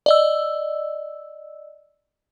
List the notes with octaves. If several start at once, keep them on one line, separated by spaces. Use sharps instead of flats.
D5 D#5 E6